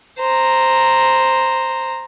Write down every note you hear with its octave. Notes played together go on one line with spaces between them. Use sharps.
C5 A#5